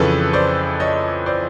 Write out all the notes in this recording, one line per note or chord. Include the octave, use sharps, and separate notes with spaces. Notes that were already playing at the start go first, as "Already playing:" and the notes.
Already playing: F2 C#3 E3 A4 B4
C5 D5
C#5 D#5
C5 D5